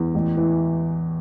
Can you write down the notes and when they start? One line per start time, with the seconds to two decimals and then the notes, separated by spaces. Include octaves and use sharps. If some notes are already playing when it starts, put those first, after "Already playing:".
Already playing: E2
0.14 A1
0.37 E3